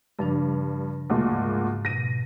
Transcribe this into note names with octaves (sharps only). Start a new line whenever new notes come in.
G2 C#3 F3 D4
D2 A#2 G#3
G#2
B2 A#6 D#7